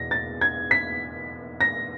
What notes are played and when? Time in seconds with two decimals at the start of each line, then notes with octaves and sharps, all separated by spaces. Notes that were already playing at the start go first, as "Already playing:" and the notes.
Already playing: E2 B2 A#6
0.11 A6
0.41 G#6
0.71 B6
1.61 A#6